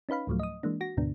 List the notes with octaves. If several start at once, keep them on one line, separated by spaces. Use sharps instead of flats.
C#4 D#4 B4 F5 B5
D2 A2 F3 F#3 A3
D#5 D#6
E3 G#3 A#3 D4
F#4 A#6
D2 G#2 B2 D3 B3 D4